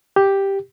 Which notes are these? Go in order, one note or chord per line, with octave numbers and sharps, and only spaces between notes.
G4